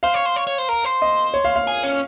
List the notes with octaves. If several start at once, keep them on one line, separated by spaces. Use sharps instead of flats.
C5 F5
C#5
C5
C#5
C#5
C5
A#4
C5
D#5
C#5
F5
F5
G#4
C#4